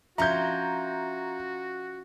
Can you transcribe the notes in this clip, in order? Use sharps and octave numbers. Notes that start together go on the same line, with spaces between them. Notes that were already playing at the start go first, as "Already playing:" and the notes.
F3 C#4 F4 F#4 E5 A#5 G6 G#6